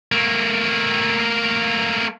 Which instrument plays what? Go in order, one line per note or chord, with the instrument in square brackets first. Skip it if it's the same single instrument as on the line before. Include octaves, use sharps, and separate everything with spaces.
[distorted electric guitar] A3 A#3